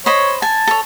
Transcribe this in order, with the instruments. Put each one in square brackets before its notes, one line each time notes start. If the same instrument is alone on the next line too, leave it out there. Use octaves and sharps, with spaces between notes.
[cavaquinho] C5 D#5 B5 [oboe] C#5
[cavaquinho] G#5 [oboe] A5
[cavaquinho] A4 C#5